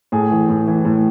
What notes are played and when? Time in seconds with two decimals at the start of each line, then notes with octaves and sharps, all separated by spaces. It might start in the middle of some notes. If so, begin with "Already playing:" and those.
0.12 A2 G#4
0.31 E3
0.49 A2
0.67 E3
0.85 A2